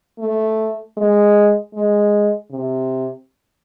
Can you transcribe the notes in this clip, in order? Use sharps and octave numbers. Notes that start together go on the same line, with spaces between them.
A3
G#3
G#3
C3